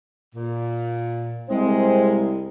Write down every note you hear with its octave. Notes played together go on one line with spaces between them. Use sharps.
A#2
C2 G#3 C4 G4 A#4 C5